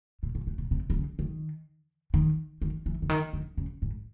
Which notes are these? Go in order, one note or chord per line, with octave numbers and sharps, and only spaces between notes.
A#2
A#2
A#2
B2
C3
D3
C#3
D#3
D#3
D#3
E3
D3
D#3
D3
C#3
G#2